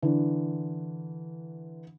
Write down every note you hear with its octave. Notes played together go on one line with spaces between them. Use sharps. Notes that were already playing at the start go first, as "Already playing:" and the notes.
D3 E3